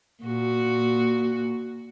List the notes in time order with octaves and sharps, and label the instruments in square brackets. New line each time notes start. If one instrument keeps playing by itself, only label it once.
[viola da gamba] A#2 F#4